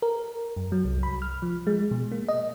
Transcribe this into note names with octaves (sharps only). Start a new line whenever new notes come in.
A#4
F#2
F#3
C2
B5
F6
F3
G#3
B2
A#3
D#5